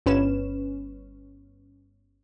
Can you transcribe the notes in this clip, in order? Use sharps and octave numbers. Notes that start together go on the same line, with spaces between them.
G1 C#4 B4 E7